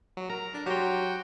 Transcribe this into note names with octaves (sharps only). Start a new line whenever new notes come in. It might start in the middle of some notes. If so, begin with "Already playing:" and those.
F#3
A#4 A#5
D4
F#3 F#4 G4 C5 G5